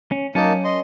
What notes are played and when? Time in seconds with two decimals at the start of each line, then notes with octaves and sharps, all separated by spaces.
0.12 C#4
0.35 F#3 A#3 C#4 D#4 A#4 A5
0.64 D#5 C6